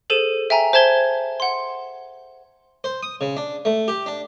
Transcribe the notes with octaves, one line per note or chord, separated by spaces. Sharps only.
G#4 A4 C5 D#7 E7
E5 G5 G#5 A#5
C5 E5 A5 G#6 G7
F#5 C6
C5
D#6
C#3
D4
A3
G4
D4